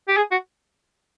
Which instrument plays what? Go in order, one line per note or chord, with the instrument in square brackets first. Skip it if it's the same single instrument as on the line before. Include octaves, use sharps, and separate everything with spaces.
[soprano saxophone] G4
G#4
F#4